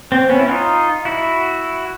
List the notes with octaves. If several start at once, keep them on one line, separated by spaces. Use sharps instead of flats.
C4
B3 C#4
E4
D#4 F4
E4 F#4